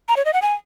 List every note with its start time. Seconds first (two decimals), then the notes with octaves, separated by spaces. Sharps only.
0.08 A#5
0.17 C#5
0.25 D#5
0.33 F#5
0.42 G#5